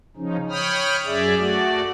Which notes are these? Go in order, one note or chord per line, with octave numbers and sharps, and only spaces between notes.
C#3 F3 C#4 D#4
C#5 G5 B5 D#6 F6
F#2 G#4 D5 E5
A3 F#4 D5